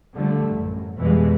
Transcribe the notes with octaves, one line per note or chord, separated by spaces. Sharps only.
D3 F3 G3 A3
A1 F#2
F2 B2 E3 F3 G3 G#3